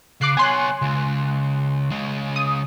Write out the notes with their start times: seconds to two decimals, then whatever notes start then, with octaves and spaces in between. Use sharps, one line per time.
0.21 C#3 D6 F#6 C7
0.37 B3 C#5 G#5 C6 F#6
0.82 C#2
1.91 C#3 G#3
2.36 D#6